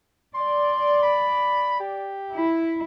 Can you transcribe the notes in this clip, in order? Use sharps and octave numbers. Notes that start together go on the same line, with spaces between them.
D5 C6
B5
G4
E4